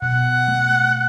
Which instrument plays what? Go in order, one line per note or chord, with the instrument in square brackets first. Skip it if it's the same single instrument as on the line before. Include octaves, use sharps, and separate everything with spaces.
[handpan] B2 [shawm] F#5
[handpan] A3